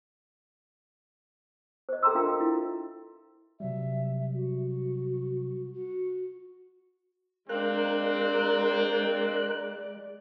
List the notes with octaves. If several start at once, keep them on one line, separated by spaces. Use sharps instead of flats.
C5 D#5
A4 G5 A#5 C6 E6
D4 F4 A#4 E5 F5 G5
E4
C3 F#3 G3 E5
F#4
F#4
G#3 C4 D4 A#4 D5 F5 F#6